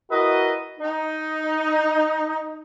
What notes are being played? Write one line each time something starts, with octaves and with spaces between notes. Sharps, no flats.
E4 F#4 A#4 B4 D#5
D#4